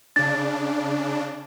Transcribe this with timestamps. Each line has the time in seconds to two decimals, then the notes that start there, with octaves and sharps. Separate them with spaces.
0.16 C#3 D4 A6